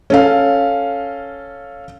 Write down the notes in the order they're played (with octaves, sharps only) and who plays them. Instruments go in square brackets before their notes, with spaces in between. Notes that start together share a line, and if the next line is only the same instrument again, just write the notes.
[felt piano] C#4 A4 F5